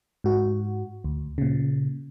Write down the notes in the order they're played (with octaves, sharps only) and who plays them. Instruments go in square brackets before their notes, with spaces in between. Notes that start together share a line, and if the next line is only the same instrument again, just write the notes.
[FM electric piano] G#2 F#4
D2
A#2 C#3